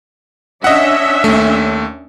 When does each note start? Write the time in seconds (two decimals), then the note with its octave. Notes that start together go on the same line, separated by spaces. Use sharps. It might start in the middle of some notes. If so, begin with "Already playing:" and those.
0.64 C#4 D4 D#5 E5 F#5
1.24 D#2 A3